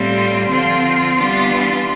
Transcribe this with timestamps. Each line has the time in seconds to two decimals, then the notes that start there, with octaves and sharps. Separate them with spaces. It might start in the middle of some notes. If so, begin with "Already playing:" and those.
Already playing: A2 G3 C4 F4
0.49 D3 F3 C4 F4
1.17 E3 G3 B3 D4 F4